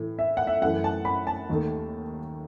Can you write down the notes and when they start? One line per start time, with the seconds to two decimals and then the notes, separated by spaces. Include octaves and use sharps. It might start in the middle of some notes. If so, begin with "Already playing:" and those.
Already playing: A2 E3 A3
0.19 E5
0.37 F#5
0.47 E5
0.61 F#2 E3 A3 F#5
0.84 A5
1.05 B5
1.27 A5
1.49 D#2 D#3 A3